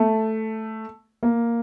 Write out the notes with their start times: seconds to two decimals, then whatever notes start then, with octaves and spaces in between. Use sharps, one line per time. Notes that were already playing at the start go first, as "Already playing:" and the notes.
Already playing: A3
1.23 A#3